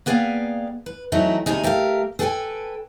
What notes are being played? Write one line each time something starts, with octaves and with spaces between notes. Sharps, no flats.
A#3 B3 G#4 D5 F5 G5
B4
E3 F#3 A3 C4 D#4 E4
D2 G#2 C3 D#4 G#4
A3 G4 A#4 D#5 F5
G#4 A4 B4 C#5 G5 G#5